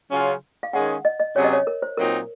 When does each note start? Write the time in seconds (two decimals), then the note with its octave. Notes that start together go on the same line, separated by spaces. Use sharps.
0.11 C#3 F#3 C#4 F4
0.63 F5
0.73 D#3 G#3 C#4 G#4 F#5
1.05 D#5
1.19 D#5
1.35 C3 F#3 C#4 G#4 C#5
1.44 D#5
1.53 C#5
1.67 A#4
1.82 C5
1.97 A#2 F#3 C4 D#4 A#4